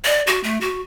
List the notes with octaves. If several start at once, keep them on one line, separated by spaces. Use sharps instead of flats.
D5
F#4
A3
F#4